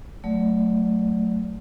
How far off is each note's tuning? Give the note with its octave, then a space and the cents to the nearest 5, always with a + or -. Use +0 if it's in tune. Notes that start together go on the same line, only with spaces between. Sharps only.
F#3 +0 A3 +0 D5 -25